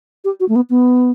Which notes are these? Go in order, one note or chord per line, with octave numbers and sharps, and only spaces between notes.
G4
F#4
A3
B3
B3